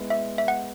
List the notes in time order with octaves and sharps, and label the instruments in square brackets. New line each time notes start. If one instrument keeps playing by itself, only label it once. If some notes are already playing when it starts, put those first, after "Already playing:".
Already playing: [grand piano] G#3 B3 E4
[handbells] E5
E5
F#5